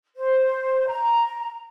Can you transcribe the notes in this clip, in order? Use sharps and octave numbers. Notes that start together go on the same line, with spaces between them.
C5
A#5